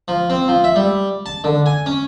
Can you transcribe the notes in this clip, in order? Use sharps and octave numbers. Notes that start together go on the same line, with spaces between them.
F3
C4
F3
E5
G3
A5
D3
G#5
C#4